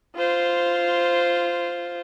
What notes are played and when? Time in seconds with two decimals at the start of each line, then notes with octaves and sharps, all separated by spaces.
0.16 F4 C5